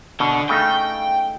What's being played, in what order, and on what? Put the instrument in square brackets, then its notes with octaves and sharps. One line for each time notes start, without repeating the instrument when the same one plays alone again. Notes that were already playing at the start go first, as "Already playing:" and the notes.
[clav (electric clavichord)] B2 [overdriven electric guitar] D3
[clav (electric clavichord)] C#3 A3 D#4 [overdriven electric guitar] G5